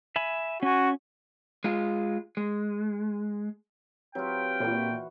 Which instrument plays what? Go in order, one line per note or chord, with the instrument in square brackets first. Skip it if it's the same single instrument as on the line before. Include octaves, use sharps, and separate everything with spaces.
[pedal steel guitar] E5 G#5 B5
[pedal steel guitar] C#4 G#5 [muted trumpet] F#4
[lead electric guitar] G#3 F4
G#3
[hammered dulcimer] F#3 F4 [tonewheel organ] C4 G4 B4 [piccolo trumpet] G5
[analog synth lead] A#2 [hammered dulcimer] E3 F#4